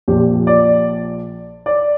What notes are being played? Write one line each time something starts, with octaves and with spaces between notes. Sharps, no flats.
A#1 A#2 F3 G4
D5
D5